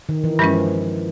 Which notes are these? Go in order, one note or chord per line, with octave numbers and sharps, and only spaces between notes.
D#3
E3
G2 E3 F3 G#3 C#4